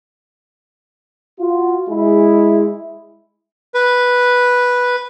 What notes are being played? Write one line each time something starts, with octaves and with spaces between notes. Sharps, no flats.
F4 F#4
G#3 E4 G#4
B4